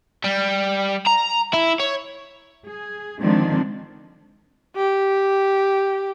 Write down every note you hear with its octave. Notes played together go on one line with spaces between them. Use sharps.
G3
A#5
E4
C#5
G#4
D3 D#3 F3 G#3 C4 D4
G4